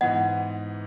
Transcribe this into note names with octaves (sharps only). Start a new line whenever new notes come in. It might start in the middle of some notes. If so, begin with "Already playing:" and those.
G#2 E3 B3 D#5 F#5